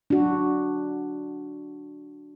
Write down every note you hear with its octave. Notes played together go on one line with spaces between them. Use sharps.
D4 F#4